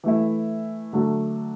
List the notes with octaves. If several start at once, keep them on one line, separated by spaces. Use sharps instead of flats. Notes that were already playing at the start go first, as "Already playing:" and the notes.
E3 A3 E4
D3 F#3 A3